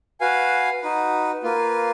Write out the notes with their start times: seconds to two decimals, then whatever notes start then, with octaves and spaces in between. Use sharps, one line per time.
0.20 F#4 B4 F5 G#5
0.82 D#4 F#4 B4
1.43 A#3 F4 B4